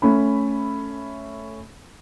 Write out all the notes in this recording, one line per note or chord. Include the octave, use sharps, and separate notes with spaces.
A3 C#4 B5